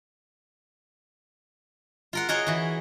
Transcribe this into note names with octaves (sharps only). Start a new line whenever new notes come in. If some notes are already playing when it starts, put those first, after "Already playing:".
F4 A#4 F#5
F#4 G#4 A#4 C#5 D#5
E3 F#4